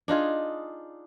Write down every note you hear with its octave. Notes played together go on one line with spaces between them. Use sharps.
D4 D#4 F4 G#4